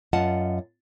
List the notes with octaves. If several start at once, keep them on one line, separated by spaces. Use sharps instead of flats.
F#2 F4 D#5 F#5 A5